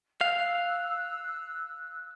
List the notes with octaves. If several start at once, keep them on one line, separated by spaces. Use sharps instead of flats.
F5 E6 F#6